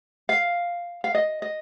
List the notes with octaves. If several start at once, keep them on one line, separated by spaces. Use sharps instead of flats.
F5
F5
D#5
D#5